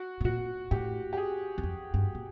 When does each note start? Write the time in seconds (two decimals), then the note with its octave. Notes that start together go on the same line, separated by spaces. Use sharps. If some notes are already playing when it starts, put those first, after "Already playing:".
Already playing: F#4
0.21 B2
0.24 A#2 F#4
0.71 A2 G4
1.13 G4
1.17 G#4
1.58 E2
1.63 F2
1.94 G2
2.15 A#2